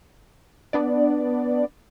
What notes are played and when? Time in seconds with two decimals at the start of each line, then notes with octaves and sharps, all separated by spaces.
0.73 B3 D4 D5